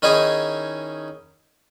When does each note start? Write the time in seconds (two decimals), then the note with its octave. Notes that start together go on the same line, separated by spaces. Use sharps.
0.02 D#3 C#4 D#4 E4 G#4